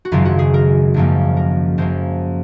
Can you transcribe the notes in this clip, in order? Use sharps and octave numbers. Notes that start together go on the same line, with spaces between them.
F#4
G#1 F#2 C#3 F#3 F4
F#4
G#4
A#4
G#1 F#2 F3 A#3
A#4
F#2 F3 A#3 C5